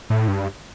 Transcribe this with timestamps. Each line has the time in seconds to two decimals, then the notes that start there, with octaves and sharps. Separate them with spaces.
0.10 A2
0.28 G2